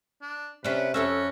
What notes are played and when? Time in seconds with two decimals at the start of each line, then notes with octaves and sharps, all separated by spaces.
0.22 D4
0.64 C3 C#4 D4 B4
0.94 F2 C#4 F#4 A4 E5